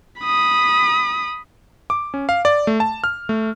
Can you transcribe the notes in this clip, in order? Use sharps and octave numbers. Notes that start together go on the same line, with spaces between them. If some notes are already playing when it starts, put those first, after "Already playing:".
B5 D#6
D6
C#4
F5
D5
A3
A5
F6
A3